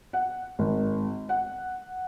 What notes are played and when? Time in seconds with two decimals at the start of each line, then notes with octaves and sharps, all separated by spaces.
0.13 F#5
0.59 G#1
1.29 F#5